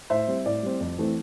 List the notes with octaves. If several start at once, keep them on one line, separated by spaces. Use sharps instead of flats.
A2 C5 E5
G3 C4
A2 D5
G3 C4
F2
E3 A3 C4